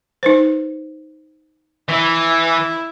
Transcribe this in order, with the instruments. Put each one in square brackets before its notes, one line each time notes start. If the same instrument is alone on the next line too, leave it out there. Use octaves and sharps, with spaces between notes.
[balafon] D#4 B4 C5
[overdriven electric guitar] E3 [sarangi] E4